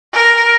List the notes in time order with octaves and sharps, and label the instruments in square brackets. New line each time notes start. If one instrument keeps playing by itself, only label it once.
[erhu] A#4